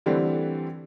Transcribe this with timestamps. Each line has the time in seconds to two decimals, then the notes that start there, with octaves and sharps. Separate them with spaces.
0.06 D3 E3 G3 A3 C4